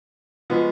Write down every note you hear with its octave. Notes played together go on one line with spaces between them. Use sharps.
F3 G#3 B3 F#4